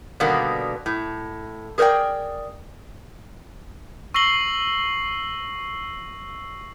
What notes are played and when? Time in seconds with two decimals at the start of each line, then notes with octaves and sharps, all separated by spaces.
0.20 B2 D3 D#3 G3 A#3 B3
0.86 A2
1.78 G#4 A#4 C5 D5 G5
4.14 C#6 E6 A#6 C7 F#7 G7